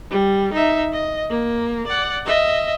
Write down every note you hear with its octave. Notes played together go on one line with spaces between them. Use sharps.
G3
D#4 E5
D#5
A#3
D5 F#5
D#5 E5